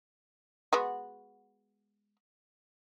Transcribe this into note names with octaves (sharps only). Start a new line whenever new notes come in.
G#3 B3 F#4